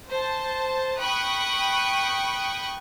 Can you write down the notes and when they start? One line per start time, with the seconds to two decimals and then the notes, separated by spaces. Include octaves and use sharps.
0.10 C5 A5
0.98 G5 B5 C#6 D#6 F#6